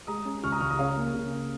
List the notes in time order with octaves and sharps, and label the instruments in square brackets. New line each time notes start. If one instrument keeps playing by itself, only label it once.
[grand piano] G#3 A#5 D#6
C#4
C#2 C#6 F6
A#5 D#6
C#2 C#6 F6
A#5 D#6
C#3 C#5 F5
A#3
C#3